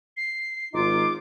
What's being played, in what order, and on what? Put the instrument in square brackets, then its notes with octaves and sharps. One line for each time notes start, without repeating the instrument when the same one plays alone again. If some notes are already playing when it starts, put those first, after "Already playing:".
[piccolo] C7
[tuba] G#1 [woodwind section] D#4 F4 [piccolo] D6